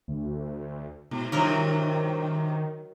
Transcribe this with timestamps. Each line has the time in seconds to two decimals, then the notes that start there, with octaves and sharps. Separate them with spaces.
0.08 D2
1.11 G#2 B2
1.32 G2 C3 D#3 E3 F#3 A#4